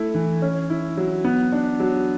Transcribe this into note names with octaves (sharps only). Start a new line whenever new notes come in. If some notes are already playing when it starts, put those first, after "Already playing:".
Already playing: A3 E4
E3
C#4
E4
F#3
B3
D4
F#3